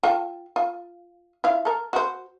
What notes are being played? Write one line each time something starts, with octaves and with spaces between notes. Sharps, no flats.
F4 A4 G5
F4
E4 F4 F5
A4 A#4
F#4 C5